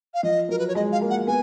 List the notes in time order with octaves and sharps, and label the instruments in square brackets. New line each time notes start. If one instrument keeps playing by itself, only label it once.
[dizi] F5
[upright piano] F3 [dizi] D#5
[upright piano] F#3 [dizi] A#4
[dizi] B4
C#5
[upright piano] G#3 [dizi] D#5
[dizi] F5
[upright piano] A#3
[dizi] F#5
[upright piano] B3 [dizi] G#5